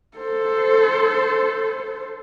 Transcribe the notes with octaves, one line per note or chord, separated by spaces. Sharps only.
A4 C5